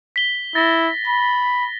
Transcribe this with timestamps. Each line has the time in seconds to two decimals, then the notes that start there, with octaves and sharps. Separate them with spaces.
0.16 B6 G7
0.55 E4 A6 A#6
1.07 B5